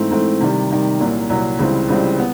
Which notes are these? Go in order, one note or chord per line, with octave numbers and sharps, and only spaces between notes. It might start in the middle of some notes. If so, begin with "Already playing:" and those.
Already playing: G#2 E3 A3 C4
G#2 E3 A3 C4
C3 D#3 G3
C3 D#3 G3
C2 A#2 F#3
C2 A#2 F#3
C#2 C#3 E3 G3 C4
C#2 C#3 E3 G3 C4
B3